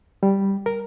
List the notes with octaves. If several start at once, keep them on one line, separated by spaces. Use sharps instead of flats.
G3
A#4